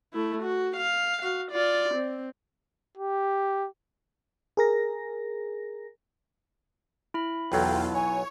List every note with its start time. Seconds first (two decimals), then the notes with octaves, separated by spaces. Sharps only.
0.14 A3 E4
0.43 F#4
0.76 F5
1.22 F#4 F5
1.51 F4 D5
1.94 C4
2.97 G4
4.57 G#4 A#4 A#6
7.14 E4 B5
7.52 B1 E2 F#3 F4 A4 G5
7.94 C#5 G#5